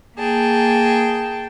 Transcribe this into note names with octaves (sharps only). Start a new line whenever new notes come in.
A#3 G#4 G5 A5